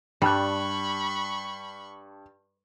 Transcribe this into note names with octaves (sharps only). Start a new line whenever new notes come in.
G2 G3 A5 B5 C#6 F#6